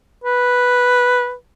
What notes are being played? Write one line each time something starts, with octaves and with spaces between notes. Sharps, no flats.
B4